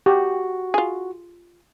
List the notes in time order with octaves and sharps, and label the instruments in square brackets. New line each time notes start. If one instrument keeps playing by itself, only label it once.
[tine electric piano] F#4 [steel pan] G4
[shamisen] F4 G#4